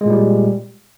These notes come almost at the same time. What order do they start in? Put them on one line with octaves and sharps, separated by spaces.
G#3 A#2 G3